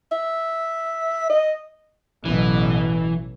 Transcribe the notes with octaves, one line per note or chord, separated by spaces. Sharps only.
E5
D#5
A1 B2 E3 F#3